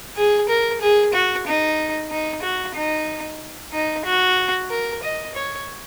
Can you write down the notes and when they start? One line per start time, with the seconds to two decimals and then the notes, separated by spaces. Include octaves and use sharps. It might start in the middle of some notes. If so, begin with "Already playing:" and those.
0.17 G#4
0.49 A#4
0.81 G#4
1.13 F#4
1.46 D#4
2.11 D#4
2.43 F#4
2.75 D#4
3.73 D#4
4.05 F#4
4.70 A#4
5.03 D#5
5.35 C#5